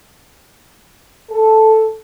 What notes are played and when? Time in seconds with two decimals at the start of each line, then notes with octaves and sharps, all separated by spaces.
1.30 A4